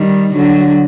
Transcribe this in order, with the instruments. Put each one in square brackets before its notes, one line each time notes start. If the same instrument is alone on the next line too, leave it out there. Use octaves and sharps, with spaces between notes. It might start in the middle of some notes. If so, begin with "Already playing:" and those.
Already playing: [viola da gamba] D#3 G3
D3 F#3